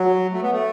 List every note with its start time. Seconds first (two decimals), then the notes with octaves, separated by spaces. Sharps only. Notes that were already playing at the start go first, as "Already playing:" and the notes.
Already playing: F#3
0.32 A3
0.42 B3
0.52 A3